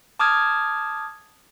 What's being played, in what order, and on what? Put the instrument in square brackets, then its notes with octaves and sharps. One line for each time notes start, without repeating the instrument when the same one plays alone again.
[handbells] A5 D6 D#6 F6 G#6